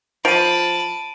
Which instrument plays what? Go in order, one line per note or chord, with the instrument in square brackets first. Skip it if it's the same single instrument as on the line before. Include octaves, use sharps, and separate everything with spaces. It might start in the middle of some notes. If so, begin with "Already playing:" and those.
[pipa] F3 [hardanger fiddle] A5 B5 [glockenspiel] D7 D#7